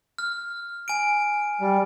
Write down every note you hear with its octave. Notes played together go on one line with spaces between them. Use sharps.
F6
G#5 D7
G3